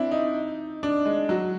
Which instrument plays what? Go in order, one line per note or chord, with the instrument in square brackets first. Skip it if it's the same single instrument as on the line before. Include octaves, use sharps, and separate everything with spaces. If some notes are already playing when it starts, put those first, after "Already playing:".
Already playing: [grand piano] C4 D4 E4
D#4
D4
G#3
F#3